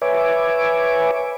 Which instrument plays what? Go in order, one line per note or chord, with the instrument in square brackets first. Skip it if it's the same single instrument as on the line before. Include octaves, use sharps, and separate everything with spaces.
[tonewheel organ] B4 C#5 E5 G#5 D6